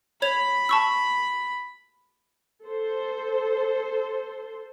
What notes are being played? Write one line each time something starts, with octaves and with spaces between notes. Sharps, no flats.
C#5 B5 G#6 F7
A5 C#6 E6
A4 C5